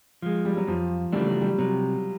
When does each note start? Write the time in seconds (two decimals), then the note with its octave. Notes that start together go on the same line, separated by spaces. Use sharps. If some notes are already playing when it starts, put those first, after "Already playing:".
0.22 F3 G#3
0.45 G3
0.57 F#3
0.67 F2 F3
1.12 C#3 E3 G3 A3 D4
1.27 F#3
1.41 G3
1.58 C3 F#3